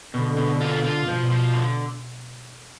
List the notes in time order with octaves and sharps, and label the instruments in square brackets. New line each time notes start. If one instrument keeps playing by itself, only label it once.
[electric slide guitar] B2 [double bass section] D3
[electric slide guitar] B2
F4
F4
[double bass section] B2 [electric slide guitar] F3
[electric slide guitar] F3
D3